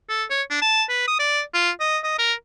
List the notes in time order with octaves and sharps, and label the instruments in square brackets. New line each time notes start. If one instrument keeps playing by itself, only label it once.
[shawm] A4
C#5
D4
A5
B4
D#6
D5
F4
D#5
D#5
A#4